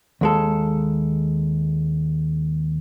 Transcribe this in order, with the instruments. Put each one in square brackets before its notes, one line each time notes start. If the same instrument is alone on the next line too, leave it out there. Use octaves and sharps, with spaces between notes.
[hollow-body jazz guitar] D#2 G#3 A4